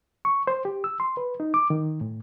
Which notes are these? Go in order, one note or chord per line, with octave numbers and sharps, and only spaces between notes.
C#6
C5
G4
E6
C6
B4
D#4
D6
D#3
A2